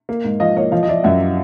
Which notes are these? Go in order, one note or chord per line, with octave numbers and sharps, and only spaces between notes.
A#3
G#2
F3 D#5 F5
A#3 C#5 D#5
F3 D#5 F5
D#5
F3 D5 E5
F#2 E5 F#5